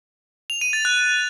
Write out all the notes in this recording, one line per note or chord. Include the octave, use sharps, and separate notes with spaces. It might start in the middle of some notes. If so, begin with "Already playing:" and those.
F7
D#7
A6
F#6